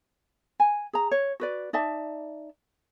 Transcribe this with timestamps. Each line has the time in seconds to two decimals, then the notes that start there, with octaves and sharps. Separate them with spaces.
0.60 G#5
0.93 G#4 A#5
1.11 C#5
1.40 F#4 B4 D5
1.73 D#4 D5 E5 A5